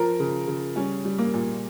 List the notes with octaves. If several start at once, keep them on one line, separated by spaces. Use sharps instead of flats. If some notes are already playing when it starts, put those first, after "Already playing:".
Already playing: F3 A#4
C#3
C#3
G3 C#4
G3
A#3
A#2